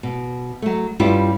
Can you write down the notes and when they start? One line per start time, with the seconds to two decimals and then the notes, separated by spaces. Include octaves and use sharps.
0.03 B2
0.62 F#3 A3
1.00 G2 G3 C#4 E4 F4 G4